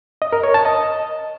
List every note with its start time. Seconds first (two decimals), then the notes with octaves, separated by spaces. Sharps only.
0.22 D#5
0.33 A#4
0.43 C#5
0.54 A5
0.65 D#5